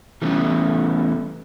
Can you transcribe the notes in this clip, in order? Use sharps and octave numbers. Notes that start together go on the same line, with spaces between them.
E3 G3 A3 B3 C#4